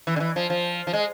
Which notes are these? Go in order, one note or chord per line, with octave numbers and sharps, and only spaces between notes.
E3
D3
E3
F3
F3
F3
G#3